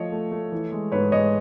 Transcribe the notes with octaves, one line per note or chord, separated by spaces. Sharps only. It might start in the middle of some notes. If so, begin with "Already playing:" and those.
Already playing: F3 A3 C#5 D#5
A3
A3
E3
G#3
G#2 B4 C#5
G#3 C#5 D#5